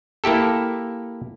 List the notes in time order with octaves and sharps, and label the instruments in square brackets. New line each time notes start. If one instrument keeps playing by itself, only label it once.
[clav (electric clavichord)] A#3 E4 G4 A4